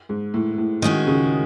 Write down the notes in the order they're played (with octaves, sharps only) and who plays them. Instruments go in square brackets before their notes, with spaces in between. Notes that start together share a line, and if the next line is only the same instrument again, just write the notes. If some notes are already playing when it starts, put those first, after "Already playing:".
[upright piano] G#2
A2
A2
[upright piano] A2 [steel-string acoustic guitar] D#3 G#3 C#4 F#4
[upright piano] C#2 C#3